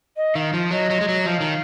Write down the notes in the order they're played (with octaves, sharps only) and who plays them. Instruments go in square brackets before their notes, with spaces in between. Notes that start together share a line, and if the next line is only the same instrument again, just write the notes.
[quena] D#5
[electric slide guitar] D#3 [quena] F5
[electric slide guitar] F3
[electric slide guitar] F#3 [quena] D#5
[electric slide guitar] F#3
G#3
F#3
[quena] D#5
[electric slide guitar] F3 [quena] F5
[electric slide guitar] D#3